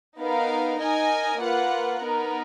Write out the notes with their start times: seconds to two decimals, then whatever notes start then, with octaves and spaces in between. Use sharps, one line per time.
0.18 B3 D#4 A#4 F5
0.78 D#4 A#4 D#5 G#5
1.39 A#3 F4 B4 F#5
2.00 B3 D#4 A#4